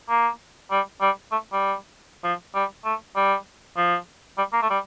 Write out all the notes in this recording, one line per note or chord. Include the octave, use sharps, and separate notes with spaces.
A#3
G3
G3
A3
G3
F3
G3
A3
G3
F3
G3
A#3
A3
G3